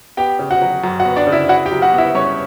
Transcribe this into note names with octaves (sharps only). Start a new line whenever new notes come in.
B3 G4 G5
C#3
F#4 F#5
F#3
F#2
F#4 F#5
B3
D4 D5
C#3
E4 E5
E4 F#4 F#5
G4 G5
F#3
F#4 F#5
B3
E4 E5
G2 C#4 C#5